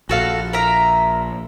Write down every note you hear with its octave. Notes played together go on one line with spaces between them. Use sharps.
A#1 A#2 F#4 A4 F5
A#4 E5 A#5